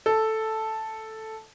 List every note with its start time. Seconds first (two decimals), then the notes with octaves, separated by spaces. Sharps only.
0.06 A4